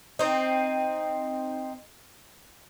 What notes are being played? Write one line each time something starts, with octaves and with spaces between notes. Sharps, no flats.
C4 D#4